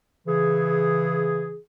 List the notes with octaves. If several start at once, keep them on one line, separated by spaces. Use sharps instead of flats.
C#3 E3 G#4